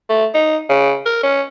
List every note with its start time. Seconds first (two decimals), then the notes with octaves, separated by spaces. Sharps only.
0.10 A3
0.34 D#4
0.69 C#3
1.06 A#4
1.23 C#4